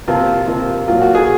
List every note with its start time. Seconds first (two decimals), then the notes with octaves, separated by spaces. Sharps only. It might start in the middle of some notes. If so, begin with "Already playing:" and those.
0.08 C3 F3 A#3 F4
0.48 C3 F3 A#3
0.88 A#2 F#3 A#3 F4
1.01 F#4
1.15 G#4